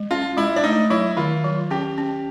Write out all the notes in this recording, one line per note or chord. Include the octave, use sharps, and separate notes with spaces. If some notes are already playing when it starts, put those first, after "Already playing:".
Already playing: G#3
C#4 F4
G#3 E4
D4
A3 D#4
F#3 E4
D#3 F4
F#3
C#4 G4
C#4